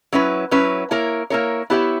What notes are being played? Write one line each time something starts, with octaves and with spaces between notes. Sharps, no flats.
F#3 C#4 E4 B4
F#3 C#4 E4 B4
A#3 E4 A#4 C#5
A#3 E4 A#4 C#5
B3 E4 G4 C#5 E5